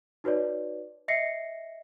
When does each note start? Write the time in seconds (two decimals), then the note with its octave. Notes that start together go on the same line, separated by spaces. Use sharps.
0.24 D#4 F#4 B4 C#5 D5
1.08 D#5 E5 A#6 C7 C#7